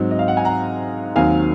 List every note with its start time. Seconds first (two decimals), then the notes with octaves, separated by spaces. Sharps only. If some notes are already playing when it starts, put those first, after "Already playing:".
Already playing: G#2 F#3 C4 D#4
0.11 D#5
0.19 F5
0.28 F#5
0.37 G#5
0.45 F#5 A#5
1.15 D#2 D#3 F#3 C4 D#4 F5 G#5